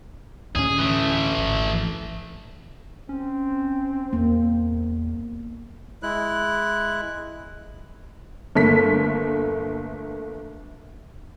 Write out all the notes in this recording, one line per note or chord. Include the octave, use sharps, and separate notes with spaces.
D2 A2 C#4 G#4
E3 A3
G#1
C4 C#4
E2 A#3
G#3 E4 F#6
G1 A3 A#3 B6